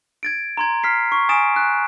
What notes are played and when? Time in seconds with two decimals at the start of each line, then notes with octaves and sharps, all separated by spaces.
0.23 G#6 A6 D7
0.57 A#5 C6 G#6
0.84 F6 B6 C7
1.12 C#6
1.29 G#5 D#6 A6 D7 E7
1.56 F#6